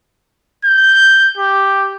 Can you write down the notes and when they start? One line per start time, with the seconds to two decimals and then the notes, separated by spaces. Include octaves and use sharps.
0.65 G6
1.37 G4